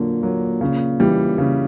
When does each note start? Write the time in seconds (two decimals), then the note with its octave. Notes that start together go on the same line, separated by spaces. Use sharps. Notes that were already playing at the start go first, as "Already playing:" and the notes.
Already playing: A#2 D3 F#3 A#3
0.22 F#3 A#3
0.61 C#3
1.00 E3 G3
1.38 C#3